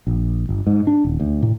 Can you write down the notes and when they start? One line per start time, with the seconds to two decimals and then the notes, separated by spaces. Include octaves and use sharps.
0.07 A#1
0.49 G1
0.67 G#2
0.87 D4
1.05 D#1
1.20 D2
1.42 A2